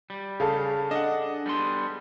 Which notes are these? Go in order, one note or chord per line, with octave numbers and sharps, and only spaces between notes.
G3
C#3 G#4 A4 F5
D4 D#5 F#5
G3 B3 C6